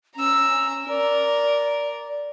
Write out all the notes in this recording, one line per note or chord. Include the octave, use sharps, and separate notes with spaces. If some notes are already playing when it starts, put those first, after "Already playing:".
C#4 A#5 E6
A#4 D5